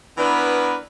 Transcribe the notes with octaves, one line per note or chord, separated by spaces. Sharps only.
E3 B3 D4 A#4 B4